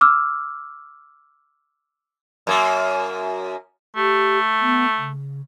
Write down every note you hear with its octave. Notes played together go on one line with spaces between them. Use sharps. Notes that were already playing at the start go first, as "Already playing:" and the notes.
D6 E6 F6
F#2 A#3
A3 G4
B3
C#3